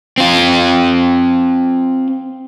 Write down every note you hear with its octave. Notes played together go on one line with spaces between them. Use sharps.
C4 F4